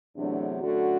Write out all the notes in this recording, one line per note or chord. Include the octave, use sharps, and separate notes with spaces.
E2 C3 F#3 A3 D4
F#2 D3 A3 F#4